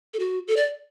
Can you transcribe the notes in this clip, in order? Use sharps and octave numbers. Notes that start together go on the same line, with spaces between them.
A4
F#4
A4
D5